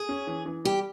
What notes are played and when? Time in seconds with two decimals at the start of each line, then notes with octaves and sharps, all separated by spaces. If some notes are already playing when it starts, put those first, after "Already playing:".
Already playing: G#4
0.09 C#4
0.27 E3
0.46 E3
0.65 G3 G4